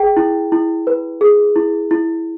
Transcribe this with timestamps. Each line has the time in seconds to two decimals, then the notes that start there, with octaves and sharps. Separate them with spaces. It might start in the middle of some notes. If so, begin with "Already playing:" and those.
Already playing: G#4 G5
0.17 E4
0.52 E4
0.87 B4
1.21 G#4
1.56 E4
1.91 E4